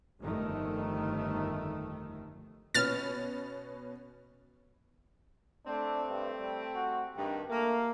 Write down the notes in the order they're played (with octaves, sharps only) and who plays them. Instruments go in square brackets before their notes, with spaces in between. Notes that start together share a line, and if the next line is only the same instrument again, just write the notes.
[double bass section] G1 F2 D#3 A3
[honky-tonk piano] B2 B3 C#4 [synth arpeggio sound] F6 A6
[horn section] A3 C4 [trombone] D4
[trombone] G2
G3
F#4
[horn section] G2 D#3 [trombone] G4
[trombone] A3 [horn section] A#3